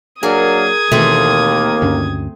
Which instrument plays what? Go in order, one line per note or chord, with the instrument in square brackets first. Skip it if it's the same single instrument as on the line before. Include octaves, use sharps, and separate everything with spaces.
[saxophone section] F#3 A#3 D4 [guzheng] G#4 A#4 [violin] D#6 G#6
[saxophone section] D#2 A#3 [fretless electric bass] B2 D#3 E3 [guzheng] A3 C4
[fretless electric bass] D2 G2 C#4